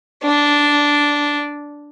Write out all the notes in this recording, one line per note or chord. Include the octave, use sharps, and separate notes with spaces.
D4